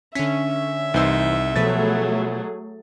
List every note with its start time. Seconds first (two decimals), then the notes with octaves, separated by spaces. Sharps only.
0.15 D3 C#4 E5 B6
0.94 C2 E3 D#4 C5 E6
1.56 B2 F3 F#3 A3 G#4 B4 A6